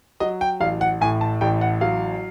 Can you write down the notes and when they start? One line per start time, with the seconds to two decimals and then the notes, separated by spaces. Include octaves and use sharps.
0.20 F#3 D#5
0.41 G5
0.60 A1 F5
0.81 F#5
1.01 A2 G#5
1.21 A5
1.41 A1 G5
1.61 F#5
1.81 F#3 F5